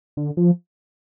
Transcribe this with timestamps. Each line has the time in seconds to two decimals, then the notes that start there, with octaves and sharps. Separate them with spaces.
0.17 D3
0.37 F3